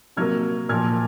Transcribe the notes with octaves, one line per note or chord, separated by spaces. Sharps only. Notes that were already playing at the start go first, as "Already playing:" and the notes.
C3 F#3 A#3 F6 G#6
A#2 F3 A#3 F6 G#6